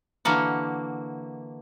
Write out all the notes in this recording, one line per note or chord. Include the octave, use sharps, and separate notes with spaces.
D3 E3 A#3 F#4